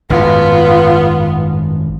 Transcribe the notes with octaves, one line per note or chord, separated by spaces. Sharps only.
G#1 F#2 A2 B3 F4